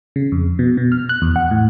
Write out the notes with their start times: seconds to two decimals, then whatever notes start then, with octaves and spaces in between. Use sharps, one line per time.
0.16 C#3
0.32 F2
0.59 B2
0.77 B2
0.92 F6
1.09 F#6
1.22 E2
1.36 F#5
1.51 A2